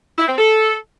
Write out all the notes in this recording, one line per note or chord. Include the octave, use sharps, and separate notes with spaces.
E4
C4
A4